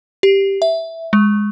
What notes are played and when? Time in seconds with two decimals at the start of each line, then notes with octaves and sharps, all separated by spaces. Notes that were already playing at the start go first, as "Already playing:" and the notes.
0.23 G4
0.62 E5
1.13 G#3